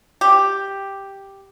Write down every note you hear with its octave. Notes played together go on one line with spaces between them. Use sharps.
G4